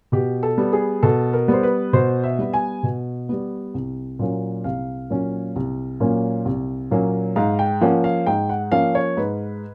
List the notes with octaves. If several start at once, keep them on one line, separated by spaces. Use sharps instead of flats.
B2 G4
A4
G3 B3
G#4
B2 A4
A#4
G3 B3 C5
B4
B2 C5
E5
G3 B3
G#5
B2
G3 B3
C2
A#2 F#3 A#3 C#4
C2 F5
A#2 F#3 A#3 C#4
C2
A#2 F#3 A#3 C#4
C2
A#2 F#3 A#3 C#4
G#2 F5
G5
F3 A#3 C#4 F#5
F5
G#2 G5
F#5
F3 A#3 C#4 F5
C#5
G#2 B4